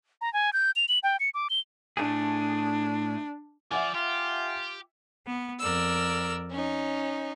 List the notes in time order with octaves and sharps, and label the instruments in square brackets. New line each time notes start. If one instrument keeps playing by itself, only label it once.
[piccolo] A#5
G#5
G6
F7
F#7
G5
C#7
D6
G7
[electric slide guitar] A2 A3 G#4 [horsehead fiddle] D4
[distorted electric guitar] F3 [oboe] D5 [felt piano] E5 F#5 G#5
[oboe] F4 [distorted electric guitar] G4
[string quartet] B3
F2 A#4 D5 E6
C#4 D#4